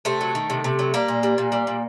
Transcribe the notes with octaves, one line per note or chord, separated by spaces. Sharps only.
C3 A3
F#3
D#3
C3
C3
F#3
G3 A#3
A#2
G3
A#2
G3
A#2